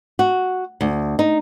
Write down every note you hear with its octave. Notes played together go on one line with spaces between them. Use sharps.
F#4
D2
D#4